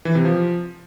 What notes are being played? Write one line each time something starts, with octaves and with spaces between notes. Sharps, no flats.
E3
C3
F3